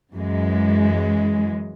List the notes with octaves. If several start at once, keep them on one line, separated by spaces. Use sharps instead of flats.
F#2 E3 G#3